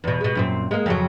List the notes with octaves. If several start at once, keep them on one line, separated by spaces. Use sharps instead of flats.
E2 B2
B2 G#3
F#2 A#2 C4
G#3 A#3
F2 C#3 F#3